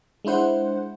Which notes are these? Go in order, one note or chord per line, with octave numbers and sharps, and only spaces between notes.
G#3 D4 E4 C5 F#5